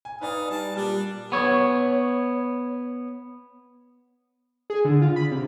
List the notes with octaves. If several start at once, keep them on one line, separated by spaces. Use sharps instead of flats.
G#5
D#4 B4 D5 F5 G#5 D#6
G3 A5
A#2 G3 D4
B3 C#5
G#4
D3
F4
B5
C3